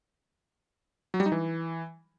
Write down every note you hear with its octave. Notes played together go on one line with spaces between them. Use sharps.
F#3
G3
D#4
E3